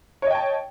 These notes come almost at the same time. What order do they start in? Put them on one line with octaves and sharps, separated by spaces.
C#5 D#5 G5 A5